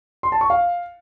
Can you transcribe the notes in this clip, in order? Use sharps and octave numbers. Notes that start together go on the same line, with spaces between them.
C6
A5
C#6
F5